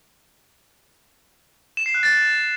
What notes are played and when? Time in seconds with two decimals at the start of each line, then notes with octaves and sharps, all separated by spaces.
1.77 E7
1.86 C7
1.94 F#6
2.03 A6